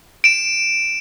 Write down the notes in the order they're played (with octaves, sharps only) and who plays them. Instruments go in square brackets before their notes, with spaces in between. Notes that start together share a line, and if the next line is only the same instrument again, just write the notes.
[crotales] D7 E7